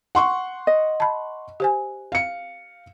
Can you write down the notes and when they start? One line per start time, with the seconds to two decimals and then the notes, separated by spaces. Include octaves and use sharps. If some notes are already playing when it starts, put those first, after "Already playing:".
0.15 F#5 C6 C#6
0.67 D#5
1.00 A5 B5
1.60 G4 C5 G#5
2.12 F5 C#7